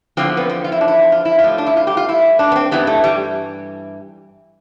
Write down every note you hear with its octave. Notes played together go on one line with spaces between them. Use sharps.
E2 D3 F3 C4
B3
C4
F4
E4
D4
E4
F4
E4
F4
A2 G3
D4
E4
F4
G4
F4
E4
D4
B3
C4
G2 E3 G3 B3
A3
G3